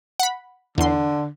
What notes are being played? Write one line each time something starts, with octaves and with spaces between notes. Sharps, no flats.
F#5 B5
E2 D3 C6